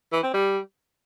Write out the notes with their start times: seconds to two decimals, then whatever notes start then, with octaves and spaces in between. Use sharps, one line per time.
0.13 E3
0.23 C4
0.34 G3